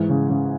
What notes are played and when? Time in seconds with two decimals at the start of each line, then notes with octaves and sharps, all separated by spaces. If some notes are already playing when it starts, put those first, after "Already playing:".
Already playing: G#2 E3
0.09 C#3
0.30 C#3